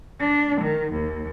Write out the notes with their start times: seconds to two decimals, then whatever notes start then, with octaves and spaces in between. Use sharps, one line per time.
0.20 D4
0.60 D#3
0.92 D#2